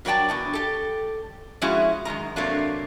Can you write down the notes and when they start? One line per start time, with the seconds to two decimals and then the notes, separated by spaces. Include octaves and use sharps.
0.05 G2 F#3 A#4 D5 G5 A5
0.29 E2 B2 D4
0.53 G4 A4
1.62 F3 G#3 C#4 E4 F#4
2.05 F#2 D#3 G#3 A#5
2.36 C3 F#3 A3 A#3 D4